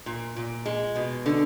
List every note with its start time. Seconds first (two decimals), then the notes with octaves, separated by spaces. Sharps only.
0.06 A#2
0.36 A#2
0.66 G#3
0.96 B2
1.26 D3